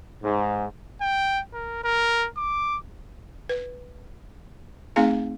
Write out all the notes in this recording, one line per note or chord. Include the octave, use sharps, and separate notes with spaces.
G#2
G5
A#4
A#4
D6
B4
A3 C4 D#4 G#4 F5 G#5